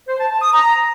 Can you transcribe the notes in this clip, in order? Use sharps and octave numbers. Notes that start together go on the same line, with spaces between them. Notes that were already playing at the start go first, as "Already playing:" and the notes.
C5
A5
A5
D#6
A#5